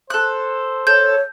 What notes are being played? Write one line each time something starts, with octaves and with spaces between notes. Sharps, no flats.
A4 C5 F#6
A4 C#5 G6